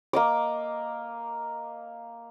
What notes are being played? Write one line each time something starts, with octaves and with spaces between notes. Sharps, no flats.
A#3 D#5 D6